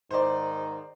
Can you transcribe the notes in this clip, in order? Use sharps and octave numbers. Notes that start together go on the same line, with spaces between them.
G#2 D#3 D#4 C5 D5